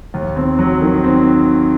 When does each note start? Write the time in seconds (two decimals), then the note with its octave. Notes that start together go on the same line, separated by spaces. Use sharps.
0.14 D#2
0.36 C4
0.59 F#3
0.81 D#3
1.04 C4